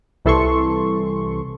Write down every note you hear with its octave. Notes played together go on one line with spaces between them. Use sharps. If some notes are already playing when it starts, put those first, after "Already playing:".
C2 E3 A4 C6 C#6